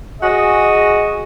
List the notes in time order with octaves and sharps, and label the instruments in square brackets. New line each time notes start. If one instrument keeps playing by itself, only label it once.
[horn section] F#4 G#4 D#5